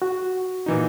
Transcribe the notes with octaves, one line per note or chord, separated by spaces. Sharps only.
F#4
A#2 E3 D#4